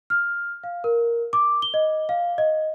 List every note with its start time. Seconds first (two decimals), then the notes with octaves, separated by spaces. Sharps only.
0.10 F6
0.64 F5
0.84 A#4
1.33 D6
1.62 G7
1.74 D#5
2.09 F5
2.38 D#5